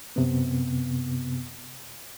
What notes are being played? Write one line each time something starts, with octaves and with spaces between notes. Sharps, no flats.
F#2 C3 B3